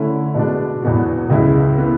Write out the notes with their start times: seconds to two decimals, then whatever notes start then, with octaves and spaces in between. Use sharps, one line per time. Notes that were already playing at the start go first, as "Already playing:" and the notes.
Already playing: D3 A3 C#4 E4
0.35 B2 G#3 D4
0.82 E2 B2 F#3 B3 F#4
1.30 C#2 C#3 G#3 C#4 E4
1.78 E3 B3